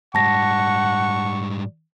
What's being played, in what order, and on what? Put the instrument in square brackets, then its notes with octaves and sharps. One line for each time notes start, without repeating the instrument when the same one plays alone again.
[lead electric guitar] G#2 G3 [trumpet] F#5 [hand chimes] A5 A#6 [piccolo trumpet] C#6